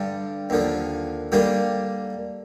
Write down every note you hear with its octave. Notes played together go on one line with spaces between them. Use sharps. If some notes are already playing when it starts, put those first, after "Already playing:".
Already playing: G2 D3 G3 D4 A4
D#2 D3 F3
D3 G3 A#3 D4 G4